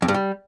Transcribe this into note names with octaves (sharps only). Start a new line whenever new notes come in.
F2
G2
G3